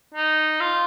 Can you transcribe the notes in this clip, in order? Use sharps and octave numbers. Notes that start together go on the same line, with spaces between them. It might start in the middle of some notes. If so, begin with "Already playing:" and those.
D#4
F4